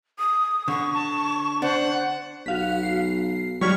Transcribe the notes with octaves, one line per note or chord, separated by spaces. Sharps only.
D#6
D3 C#6
A5
D4 C5 F#5
B1 F#4 F5 B6
C7
G#2 F#3 G3 C#6 F6 G#6 B6